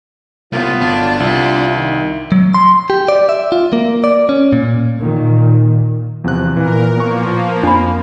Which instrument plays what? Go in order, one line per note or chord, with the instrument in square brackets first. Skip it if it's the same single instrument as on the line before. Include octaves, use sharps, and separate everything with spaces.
[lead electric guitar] C2 [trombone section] F#3 E4 [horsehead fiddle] B3 F4
[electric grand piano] G1 [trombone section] D3 F#3 [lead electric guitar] D4
[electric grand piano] C2 [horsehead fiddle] E4 [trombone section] F4
[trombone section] D#3
[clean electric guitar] F#3
C6
G4
D5
E5
F4
A#3
D5
C#4
A#2
[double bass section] A#2 D#3
[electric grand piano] E2 C3 F#6 [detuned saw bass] F3
[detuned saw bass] A#2 [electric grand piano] E3 [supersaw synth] A#4
[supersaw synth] F3 A#3 [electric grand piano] B3 C#6
[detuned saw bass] F2 [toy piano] D4 B5